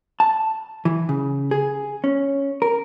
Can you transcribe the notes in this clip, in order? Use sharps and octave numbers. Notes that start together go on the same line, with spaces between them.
A5
E3
C#3
G#4
C#4
A#4